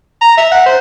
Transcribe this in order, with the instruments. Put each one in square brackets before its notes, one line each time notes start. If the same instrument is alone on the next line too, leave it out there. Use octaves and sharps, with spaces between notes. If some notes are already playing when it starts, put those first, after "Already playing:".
[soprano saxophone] A#5
E5
F#5
C5